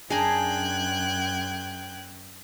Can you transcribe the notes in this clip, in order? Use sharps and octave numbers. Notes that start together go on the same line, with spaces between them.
F#2 D4 G#4 G5 G#5 A#5 F#6 G#6